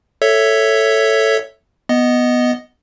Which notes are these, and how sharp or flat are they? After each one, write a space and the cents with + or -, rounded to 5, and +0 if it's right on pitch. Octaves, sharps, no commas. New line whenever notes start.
A4 +5 C#5 +0 E5 +0
B3 +0 D#5 +0